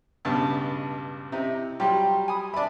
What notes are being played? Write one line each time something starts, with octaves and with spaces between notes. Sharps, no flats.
C#2 G2 B2 A5
C3 D#4 E4
F#3 G3 F4 G4
G#5 B5 D#6
D4 D5 E5 B5